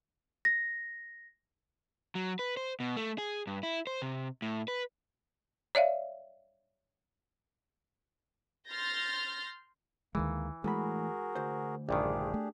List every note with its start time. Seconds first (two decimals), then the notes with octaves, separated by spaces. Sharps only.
0.45 A#6
2.15 F#3
2.39 B4
2.57 C5
2.80 B2
2.97 A3
3.18 G#4
3.47 G2
3.63 E4
3.87 C5
4.02 C3
4.42 A2
4.68 B4
5.75 C#5 D5 E5 F5
8.70 C6 F6 G6 A6 A#6
10.15 D2 D#3 E3 G#3 A#3
10.64 E2 A2 G#3 F#4 G#4 A#4 B5
11.35 D2 C5
11.89 A#1 G2 D#3 D4 G4 G#4
12.34 A3